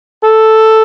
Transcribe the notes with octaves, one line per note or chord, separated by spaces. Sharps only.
A4